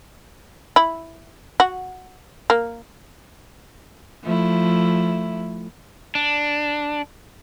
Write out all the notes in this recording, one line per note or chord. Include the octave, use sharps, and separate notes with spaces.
E4
F#4
A#3
F3 A3 E4
D4